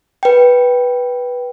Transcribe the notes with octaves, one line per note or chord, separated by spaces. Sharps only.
B4 G5